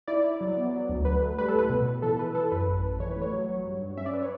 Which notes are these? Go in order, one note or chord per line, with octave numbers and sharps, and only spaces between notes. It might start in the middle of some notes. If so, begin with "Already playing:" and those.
E4 D5
E4
F#3
B3
F#3
D2
F#3 B4
A3
G3 B4
A4
A2 B4
B2
B2
E3 A4
E3 B4
E3 A4
F#2 B4
A1
A1
E3 C#5
B4
A3
C#5
F#3
F#3
G2
G2
C#4 E5
D5
B4
C#5